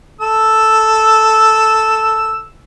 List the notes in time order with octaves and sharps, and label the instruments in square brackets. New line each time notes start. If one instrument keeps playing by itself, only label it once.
[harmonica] A4 E6